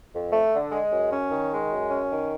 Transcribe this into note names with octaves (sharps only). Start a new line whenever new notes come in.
F2
A3
D3
G#3
F#2
C#4
D#3
G#3
F#2
C#4
D#3